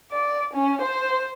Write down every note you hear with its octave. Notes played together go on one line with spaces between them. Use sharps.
D5
C#4
C5